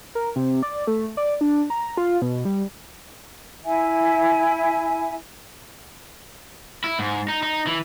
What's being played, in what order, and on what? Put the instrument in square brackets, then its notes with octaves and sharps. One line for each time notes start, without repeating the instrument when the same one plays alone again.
[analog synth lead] A#4
C3
D5
A3
D5
D4
A#5
F4
B2
G3
[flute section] E4 E5 G#5
[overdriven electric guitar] E4
G#2
D#4
D#4
E3